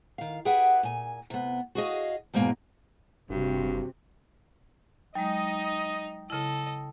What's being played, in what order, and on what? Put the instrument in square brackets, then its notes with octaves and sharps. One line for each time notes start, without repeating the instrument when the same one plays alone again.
[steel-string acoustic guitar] D#3 F5
G4 G#4 B4 E5 F#5 G5
A#2 G#5
C3 B3
F#4 G#4 D#5 F5
E2 G#2 B2 A#3 G#4
[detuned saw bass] F#1 [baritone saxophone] G2 [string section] C3 [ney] F#4
[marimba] F#3 G#3 [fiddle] D#4 [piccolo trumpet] D#5 [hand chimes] G5
[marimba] C#3 E4 [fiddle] A4 D#5